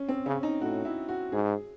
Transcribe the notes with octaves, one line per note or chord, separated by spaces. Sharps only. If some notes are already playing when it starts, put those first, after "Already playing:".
Already playing: C#4
C4
C#3 C#4
D#4
A2 F#4
E4
F#4
G#2 G#4